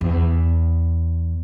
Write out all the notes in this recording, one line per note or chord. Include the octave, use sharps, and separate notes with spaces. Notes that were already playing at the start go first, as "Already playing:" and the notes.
E2